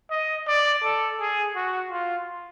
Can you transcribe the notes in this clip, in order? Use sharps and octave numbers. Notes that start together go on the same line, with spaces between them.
D#5
D5
A4
G#4
F#4
F4